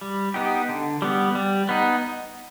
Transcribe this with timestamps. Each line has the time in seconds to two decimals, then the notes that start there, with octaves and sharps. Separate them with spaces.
0.01 G3
0.34 B3 D#4 G4
0.69 D3
1.02 G3 B3
1.35 G3
1.69 B3 D#4